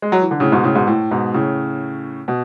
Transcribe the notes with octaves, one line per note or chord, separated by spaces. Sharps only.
G#3
F#3
E3
D3
A2 C#3
G#2 B2
A2 C#3
G#2 B2
A2
G#2 B2
A2 C#3
B2